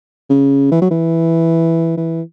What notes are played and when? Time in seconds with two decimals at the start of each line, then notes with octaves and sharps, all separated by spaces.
0.30 C#3
0.72 E3
0.82 F#3
0.91 E3
1.98 E3